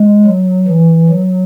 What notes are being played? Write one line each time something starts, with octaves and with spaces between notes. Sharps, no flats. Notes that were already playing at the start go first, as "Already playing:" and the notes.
Already playing: G#3
F#3
E3
F#3